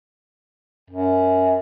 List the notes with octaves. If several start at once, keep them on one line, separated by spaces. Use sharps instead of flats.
F#2